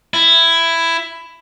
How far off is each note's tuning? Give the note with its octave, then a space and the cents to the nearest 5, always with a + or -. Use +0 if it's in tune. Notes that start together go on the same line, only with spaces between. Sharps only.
E4 +10